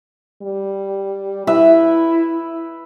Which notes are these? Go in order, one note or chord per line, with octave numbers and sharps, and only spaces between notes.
G3
E4 B4 E5